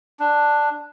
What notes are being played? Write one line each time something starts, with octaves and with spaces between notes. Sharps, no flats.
D4